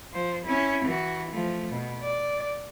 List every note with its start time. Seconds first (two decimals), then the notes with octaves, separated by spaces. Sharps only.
0.13 F3 C5
0.45 C#4 E4
0.85 E3 F#4
1.31 F3 A3
1.72 B2
2.02 D5